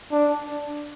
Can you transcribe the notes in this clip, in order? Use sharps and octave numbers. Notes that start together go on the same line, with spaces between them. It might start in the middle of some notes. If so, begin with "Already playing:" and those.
D4